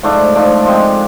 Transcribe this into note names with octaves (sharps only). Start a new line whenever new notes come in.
G#2 F3 A3 D4
G#2 F3 A3 D4
F3 G#3 C4